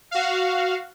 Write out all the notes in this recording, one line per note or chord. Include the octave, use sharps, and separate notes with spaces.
F#4 F5